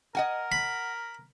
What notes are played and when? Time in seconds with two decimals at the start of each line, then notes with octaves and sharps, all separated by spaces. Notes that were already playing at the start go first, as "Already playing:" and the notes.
0.15 A#4 D#5 F#5 G#5
0.52 B5